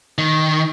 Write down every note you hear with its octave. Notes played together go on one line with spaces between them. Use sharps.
D#3